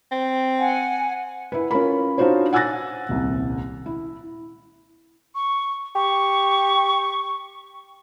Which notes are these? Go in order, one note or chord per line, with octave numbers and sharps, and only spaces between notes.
C4
F#5 G#5
E4 B4
C#4 F4 A#4 B5
D4 D#4 F4 F#4 C5 C#5
F#5 G#5 E6 F#6 A6 A#6
D#1 C2
E4
C#6
G4 C#6